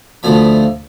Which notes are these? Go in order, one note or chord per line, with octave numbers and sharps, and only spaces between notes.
D2 F3 B5